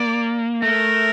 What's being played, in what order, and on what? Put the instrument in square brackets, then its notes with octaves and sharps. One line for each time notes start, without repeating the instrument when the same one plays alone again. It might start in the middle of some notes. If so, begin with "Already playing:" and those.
Already playing: [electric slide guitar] A#3 [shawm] D5
[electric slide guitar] A3 [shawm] A#4